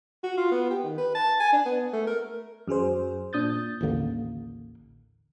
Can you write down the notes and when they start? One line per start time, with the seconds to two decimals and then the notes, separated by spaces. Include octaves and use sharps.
0.24 F#4
0.37 F4
0.51 B3
0.70 G4
0.84 D#3
0.98 B4
1.15 A5
1.40 G#5
1.52 D4
1.65 B3
1.93 A3
2.07 A#4
2.68 F#2 F#3 G#4 C5
3.33 A#2 D4 D#6 G6 A6
3.81 A1 D#2 D3 A#3